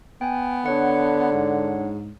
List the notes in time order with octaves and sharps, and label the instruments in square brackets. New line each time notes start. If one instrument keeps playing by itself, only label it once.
[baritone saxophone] B3 [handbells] G5 G#5
[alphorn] D3 [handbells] D4 C#5 F#5
[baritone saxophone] G#2